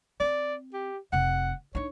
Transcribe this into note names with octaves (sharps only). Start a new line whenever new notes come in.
C4 D5
G4
F1 C3 F#5
D4 D#4 C#5